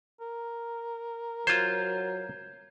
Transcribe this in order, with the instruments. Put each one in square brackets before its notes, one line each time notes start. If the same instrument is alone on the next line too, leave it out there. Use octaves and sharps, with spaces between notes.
[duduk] A#4
[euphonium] F#3 [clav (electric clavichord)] F4 C5 [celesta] G6 G#6